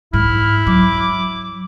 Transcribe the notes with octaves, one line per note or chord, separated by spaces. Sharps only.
G#2 E4 F6
F#3 D6